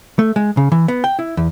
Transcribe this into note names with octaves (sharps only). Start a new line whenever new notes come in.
A3
G#3
C#3
E3
B3
G5
E4
E2